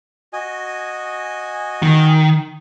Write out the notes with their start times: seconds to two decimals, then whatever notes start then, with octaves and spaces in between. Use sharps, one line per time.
0.33 F#4 D#5 G#5
1.83 D#3